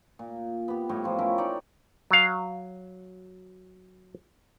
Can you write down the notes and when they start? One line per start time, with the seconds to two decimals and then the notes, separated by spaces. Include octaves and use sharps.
0.19 A#2
0.68 B3 G4
0.89 A2 G3 C#5 D#5
1.04 F3 F4
1.18 C#4 E4 G4 A#4
1.38 D#4 C#5 D5
2.11 F#3 F5